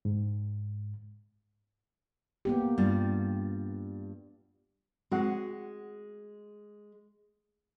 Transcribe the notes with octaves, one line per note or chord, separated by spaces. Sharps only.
G#2
A#3 B3 G4
G2 G3 F4
G#3 C4 F#4 F#5